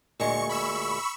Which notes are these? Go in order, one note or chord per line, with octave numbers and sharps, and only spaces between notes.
D2 A#2 G#3 C#6 C#7
B5 C#6 E6